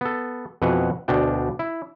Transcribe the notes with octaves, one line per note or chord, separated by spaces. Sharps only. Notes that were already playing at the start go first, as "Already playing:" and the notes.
B3 A4
F2 B2 E3 B4 F#5
D2 B2 D4 G5
E4